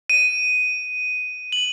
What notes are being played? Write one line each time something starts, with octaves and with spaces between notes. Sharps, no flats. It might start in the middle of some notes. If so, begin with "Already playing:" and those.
D#7
F#7